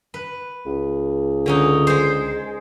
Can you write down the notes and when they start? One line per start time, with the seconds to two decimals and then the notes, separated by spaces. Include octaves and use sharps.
0.14 B4
0.66 C#2
1.46 D3 C#4 D#4
1.87 G#3 C5